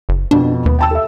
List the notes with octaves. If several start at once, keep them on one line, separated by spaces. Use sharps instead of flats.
F#1
F2 B2 D4
D#2 B3
G5 A5 E6
A4 E5